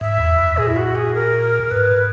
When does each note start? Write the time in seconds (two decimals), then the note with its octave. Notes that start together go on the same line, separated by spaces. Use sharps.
0.01 G#2 E5
0.20 E2
0.39 F#2
0.57 A#2 G#4
0.68 E4
0.77 F#4
0.95 G#4
1.14 A#4
1.71 G#2 B4